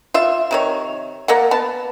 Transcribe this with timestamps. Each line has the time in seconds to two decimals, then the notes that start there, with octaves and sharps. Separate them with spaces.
0.14 F4 E5
0.51 C3 D#3 C#5
1.28 A#3 A#4 D5 F#5
1.51 B3 A5